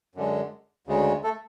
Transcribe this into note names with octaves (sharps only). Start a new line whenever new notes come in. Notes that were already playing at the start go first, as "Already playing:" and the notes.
F#2 D3 G#3
D2 C#3 G#3
A3 A4